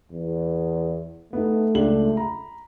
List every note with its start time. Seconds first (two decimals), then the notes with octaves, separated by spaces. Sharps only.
0.12 E2
1.33 A3 B3 D#4
1.75 C#2 D4 F#7
2.17 A#5 B5